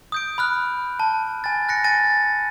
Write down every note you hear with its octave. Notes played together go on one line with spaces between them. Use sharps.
D#6 G6 D7
B5 F6 F#6
A5
G#5 A6
F#6 A#6 C#7
G#5 A6 A#6 D#7